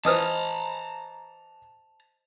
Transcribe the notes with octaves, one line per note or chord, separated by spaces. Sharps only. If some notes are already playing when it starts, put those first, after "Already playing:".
E3 C5 D#5 A5 A#5 D#6 F6